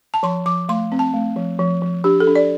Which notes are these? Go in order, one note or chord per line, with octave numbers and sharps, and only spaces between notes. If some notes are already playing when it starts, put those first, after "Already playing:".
A5
F3 C6
F3 D6
A3 C6
C4
A5
A3
F3
F3
F3
D4 G4
A4
D4
D5